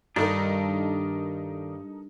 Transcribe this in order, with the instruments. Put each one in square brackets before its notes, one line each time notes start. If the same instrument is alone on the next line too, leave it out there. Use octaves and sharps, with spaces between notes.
[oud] G2 [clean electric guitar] D#3 D4 [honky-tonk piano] D#4 A4 A#4